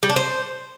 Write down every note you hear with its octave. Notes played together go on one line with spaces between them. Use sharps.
G3
D4
C5